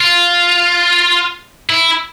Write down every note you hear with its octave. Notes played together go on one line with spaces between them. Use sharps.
F4
E4